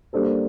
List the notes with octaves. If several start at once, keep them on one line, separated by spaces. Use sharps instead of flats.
G3 A#3 D4 A4 C5